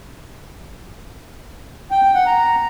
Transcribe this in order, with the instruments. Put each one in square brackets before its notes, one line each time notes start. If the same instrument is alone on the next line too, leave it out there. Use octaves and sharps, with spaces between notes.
[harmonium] G5
G5
F#5
A#5